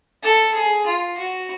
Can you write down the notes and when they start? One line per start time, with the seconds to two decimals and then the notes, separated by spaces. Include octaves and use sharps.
0.23 A4
0.54 G#4
0.86 F4
1.18 F#4